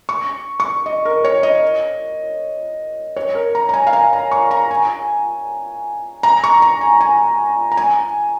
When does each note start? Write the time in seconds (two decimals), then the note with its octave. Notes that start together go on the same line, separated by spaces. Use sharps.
0.09 C#6
0.60 C#6
0.86 D#5
1.05 A#4
1.24 C#5
1.43 D#5
3.16 C#5
3.35 A#4
3.55 A#5
3.69 A#5
3.74 G#5
3.87 F5
3.93 G#5
4.13 A#5
4.32 C#6
4.51 A#5
4.71 G#5
6.23 A#5
6.44 C#6
6.62 A#5
6.81 G#5
7.01 G#5
7.72 A#5
7.77 G#5